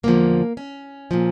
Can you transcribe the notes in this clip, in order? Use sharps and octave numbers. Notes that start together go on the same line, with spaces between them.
E2 D3 F3 A#3
C#4
A#2 F3